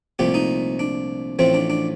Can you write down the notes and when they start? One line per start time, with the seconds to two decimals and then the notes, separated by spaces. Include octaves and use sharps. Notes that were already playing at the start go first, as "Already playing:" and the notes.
0.19 C2 A#2 F3 A3 G4
0.34 D#4
0.79 D4
1.39 A1 A2 F3 A3 C4
1.54 D4
1.70 D4